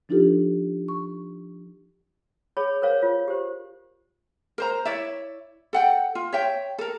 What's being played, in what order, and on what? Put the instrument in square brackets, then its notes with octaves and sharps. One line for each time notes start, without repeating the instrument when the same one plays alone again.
[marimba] F3 D4 D#4 F4 G4 A4
C#6
[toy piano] G#4 C#5 B5
A#4 C5 C#5 F5
F4 C#5
G4 C5
[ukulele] A#4 C5 A#5
E4 C#5 D5 E5
A4 F#5 G5
F4
C#5 E5 G5
A4 A#4